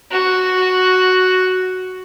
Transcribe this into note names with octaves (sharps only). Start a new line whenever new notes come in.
F#4